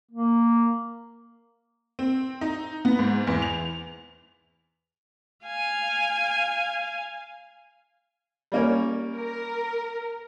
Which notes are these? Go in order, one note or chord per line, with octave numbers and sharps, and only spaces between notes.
A#3
C4
D#4
B3
G#2
E2
F7
F5 G#5
G3 A#3 C#4
A#4